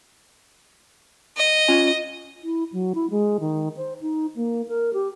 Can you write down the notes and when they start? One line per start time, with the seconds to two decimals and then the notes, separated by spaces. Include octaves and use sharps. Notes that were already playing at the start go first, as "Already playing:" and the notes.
1.37 D#5
1.68 C#4 F4 G#5
2.43 E4
2.73 F#3
2.95 E4
3.11 G#3
3.40 D#3
3.77 C5
4.01 D#4
4.36 A#3
4.68 A#4
4.93 G4